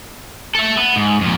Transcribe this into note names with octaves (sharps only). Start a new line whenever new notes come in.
A4 E5
B3
G#2
F2 A#2